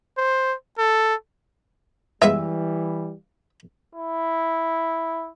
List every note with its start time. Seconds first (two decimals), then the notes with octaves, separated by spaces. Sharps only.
0.18 C5
0.79 A4
2.22 E3 G3 G#3 B3 F4 E5
3.95 E4